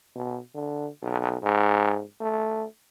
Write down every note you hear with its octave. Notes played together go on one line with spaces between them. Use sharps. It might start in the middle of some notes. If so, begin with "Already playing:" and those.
B2
D3
B1
G#2
A3